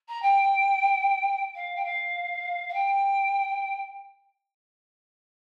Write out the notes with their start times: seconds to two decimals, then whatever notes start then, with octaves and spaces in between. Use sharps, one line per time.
0.08 A#5
0.22 G5
1.55 F5
1.75 G5
1.85 F5
2.69 F5
2.74 G5